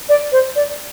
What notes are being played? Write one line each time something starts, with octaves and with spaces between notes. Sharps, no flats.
D5
C5
D5